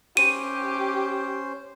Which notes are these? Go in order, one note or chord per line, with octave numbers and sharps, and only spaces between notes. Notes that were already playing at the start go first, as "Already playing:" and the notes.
C#4 G4 C5 D#7